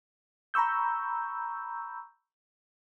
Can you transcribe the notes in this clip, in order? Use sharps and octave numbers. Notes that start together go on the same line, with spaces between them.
A#5 B5 C#6 E6 G6